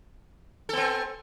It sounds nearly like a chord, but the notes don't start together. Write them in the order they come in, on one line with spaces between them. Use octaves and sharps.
A4 B3 C4